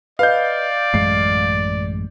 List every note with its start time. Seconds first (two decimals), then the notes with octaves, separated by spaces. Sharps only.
0.19 B4 D5 D#5 F5 G6
0.94 A1 F#2 G#3 C7